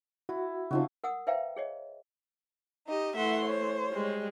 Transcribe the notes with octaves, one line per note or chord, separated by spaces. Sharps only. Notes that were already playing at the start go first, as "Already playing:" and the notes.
E4 F#4
C#3 F3 C4 D#4 F4 F#4
A#4 F#5 D#6 E6
B4 C5 E5 F5 G5 A#5
G#4 C#5 D#5
D#4 G4 D#5
E3 A3 E5 F#5 C6
C5 C#5
G3 G#3